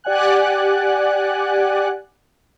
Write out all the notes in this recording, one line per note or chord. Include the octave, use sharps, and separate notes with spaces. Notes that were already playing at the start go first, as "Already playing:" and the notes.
G4 D5 F#5 G#5 F#6